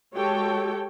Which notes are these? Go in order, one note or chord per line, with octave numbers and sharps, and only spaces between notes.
G#3 F#4 G4 A4 C#5 G5